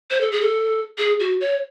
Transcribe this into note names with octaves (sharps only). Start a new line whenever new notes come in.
C5
A4
G#4
A4
G#4
F#4
C#5